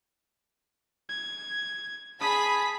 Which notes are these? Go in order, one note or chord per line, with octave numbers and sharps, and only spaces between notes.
G#6
G#4 A5 B5 D#6 B6